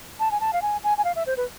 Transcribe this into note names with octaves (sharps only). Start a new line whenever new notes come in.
A5
G#5
A5
F5
G#5
G#5
G#5
F5
E5
C5
B4